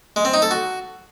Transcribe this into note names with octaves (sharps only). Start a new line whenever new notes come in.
G#3
C4
D#4
A4
F#4